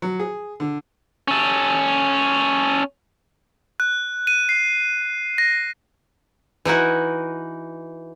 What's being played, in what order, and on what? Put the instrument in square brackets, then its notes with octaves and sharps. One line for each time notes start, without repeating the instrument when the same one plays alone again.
[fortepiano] F#3
G#4
D3
[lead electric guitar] C#4 A4
[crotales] F#6
D#7
C7
A#6
[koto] E3 D#4 E4 F#4